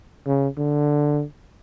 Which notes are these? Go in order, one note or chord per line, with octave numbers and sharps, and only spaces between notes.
C#3
D3